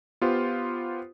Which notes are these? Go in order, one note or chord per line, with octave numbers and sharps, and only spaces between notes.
B3 F4 G4 C5